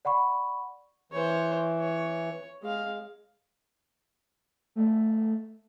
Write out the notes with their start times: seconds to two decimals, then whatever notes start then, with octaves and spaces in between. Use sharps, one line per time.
0.05 D5 F#5 B5 C#6
1.12 E3 C5 C#5
1.79 C#5
2.62 G#3 F5
4.76 A3